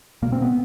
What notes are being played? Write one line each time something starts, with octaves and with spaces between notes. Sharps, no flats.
B2 A#3
C4
B3